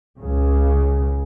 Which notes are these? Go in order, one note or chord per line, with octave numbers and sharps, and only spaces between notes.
C#2 C#3